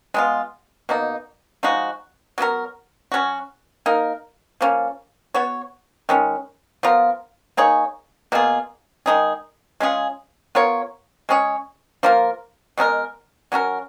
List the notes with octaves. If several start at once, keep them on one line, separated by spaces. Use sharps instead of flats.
G#3 B3 F4
B2 A#3 D#4
F3 G#3 D#4 F#4
F#3 B3 F#4 A#4
F#3 C#4 F#4
A#3 D#4 A#4
F3 A#3 C#4
B3 F#4 C#5
D#3 G#3 C#4
F3 B3 F4 A#4
A#3 D#4 G#4 C#5
B2 A#3 F4 G#4
D#3 G#3 D#4 G#4
G#3 C#4 F4 G#4
B3 F4 A#4 C#5
G#3 C#4 G#4 C#5
F3 A#3 F4 A#4
B2 G#3 D#4 A#4
F#3 C#4 F#4 A#4